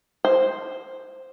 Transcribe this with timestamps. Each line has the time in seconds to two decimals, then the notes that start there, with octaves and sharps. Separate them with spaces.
0.25 C5